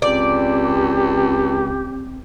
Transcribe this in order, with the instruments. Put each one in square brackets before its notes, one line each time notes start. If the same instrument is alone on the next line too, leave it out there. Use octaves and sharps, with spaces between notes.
[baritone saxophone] C#2 [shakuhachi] C4 [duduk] G4 [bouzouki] D5